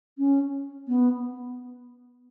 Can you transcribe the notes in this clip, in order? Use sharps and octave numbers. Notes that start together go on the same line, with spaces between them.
C#4
B3